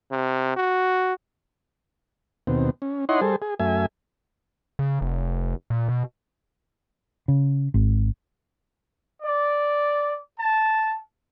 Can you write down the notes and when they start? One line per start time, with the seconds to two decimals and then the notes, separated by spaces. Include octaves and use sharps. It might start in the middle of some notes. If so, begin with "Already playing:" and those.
0.11 C3
0.56 F#4
2.47 D#2 B2 C4
2.82 C#4
3.09 D#4 E4 C#5 D#5 F#5 C6
3.21 G3 G#4 A4 C5
3.42 G#4
3.60 F#2 A3 E5 G#5
4.79 C#3
5.01 F1
5.70 A#2
5.88 B2
7.28 C#3
7.74 G#1
9.21 D5
10.38 A5